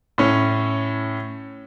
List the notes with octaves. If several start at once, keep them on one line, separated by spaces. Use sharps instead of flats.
A2 C#4